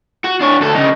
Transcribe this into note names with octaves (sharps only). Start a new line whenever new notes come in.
F#4
D4 C#5
D2 A4
C#3 D#4